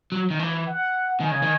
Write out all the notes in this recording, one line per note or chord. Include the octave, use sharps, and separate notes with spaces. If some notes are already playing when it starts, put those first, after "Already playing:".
F#3
D#3
E3
F#5
D#3 G#5
C#3
D#3